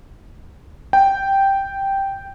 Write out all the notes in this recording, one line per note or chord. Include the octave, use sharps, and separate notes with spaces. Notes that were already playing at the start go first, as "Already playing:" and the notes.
G5